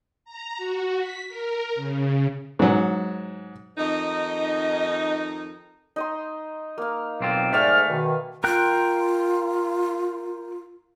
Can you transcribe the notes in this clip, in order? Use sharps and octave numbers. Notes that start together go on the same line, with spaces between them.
A#5
F#4
B6
A#4
C#3
G#2 F#3
F2 D#3 D#4 D#5
D#4 D#5 C6
A#3 F5
B1 C4 F4
G#2 A3 D5 E5 F5 G#5 F6
B2 D#3
F4 A#4 G5 F#6